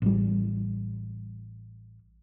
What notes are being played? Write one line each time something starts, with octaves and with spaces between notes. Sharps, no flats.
A1 G3